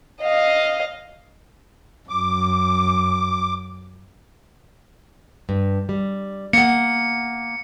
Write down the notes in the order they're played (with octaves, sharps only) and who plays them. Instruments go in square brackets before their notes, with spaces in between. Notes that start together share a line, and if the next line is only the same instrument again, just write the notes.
[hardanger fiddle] D#5 F5
[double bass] F#2 [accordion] D6
[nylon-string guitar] G2
G3
[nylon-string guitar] A#3 F#5 [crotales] C#7